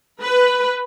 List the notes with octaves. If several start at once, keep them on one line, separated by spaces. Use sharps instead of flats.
B4